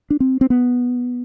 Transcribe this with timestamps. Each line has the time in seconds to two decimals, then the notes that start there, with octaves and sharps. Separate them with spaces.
0.10 D4
0.20 C4
0.41 C4
0.50 B3